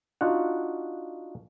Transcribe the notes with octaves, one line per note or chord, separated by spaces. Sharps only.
D4 D#4 F4 F#4 F#5